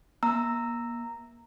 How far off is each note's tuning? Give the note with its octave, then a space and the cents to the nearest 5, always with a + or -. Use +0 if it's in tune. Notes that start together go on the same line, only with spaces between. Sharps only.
A#3 +35 A#5 -10 E6 +0